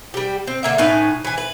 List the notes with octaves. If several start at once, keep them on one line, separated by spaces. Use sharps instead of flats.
G3 G4
C4
D3 A#3 E5
A2 C#4 D#4 B4
E3 G#5
B4